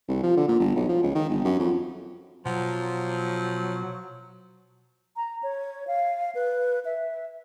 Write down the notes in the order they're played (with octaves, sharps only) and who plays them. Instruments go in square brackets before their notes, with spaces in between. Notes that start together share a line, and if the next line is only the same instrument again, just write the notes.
[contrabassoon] C2
F3
D3
A#2
G1
B1
F3
C#2
D#3
G1
F#2
F2
[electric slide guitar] B2 F#5 A#5 [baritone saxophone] F3 [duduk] F#3
[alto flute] A#5
C#5
F5
B4
E5